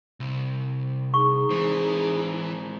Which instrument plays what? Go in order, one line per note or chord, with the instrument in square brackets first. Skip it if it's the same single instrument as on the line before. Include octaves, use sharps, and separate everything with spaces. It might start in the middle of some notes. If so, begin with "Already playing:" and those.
[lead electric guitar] C2
[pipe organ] D#4 G#4 [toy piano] C#6
[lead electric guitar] E3 [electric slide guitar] G#3 C4 C5